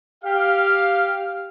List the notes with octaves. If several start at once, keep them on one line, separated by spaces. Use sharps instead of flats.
G4 F5